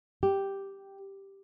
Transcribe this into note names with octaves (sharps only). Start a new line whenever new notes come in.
G4